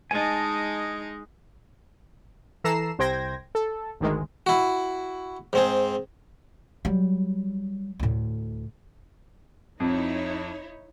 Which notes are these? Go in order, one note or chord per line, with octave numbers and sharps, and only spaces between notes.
G#3 D#4 G#5 A5
E3 A4 A#5 C7 E7
C2 C3 C5 G5 G#6 A#6
A4
G#1 D2 D#3 G#3
E4 F#4
G#2 C4 G#4
F#3 G3
D2 A2
F2 D#4 E4 C#5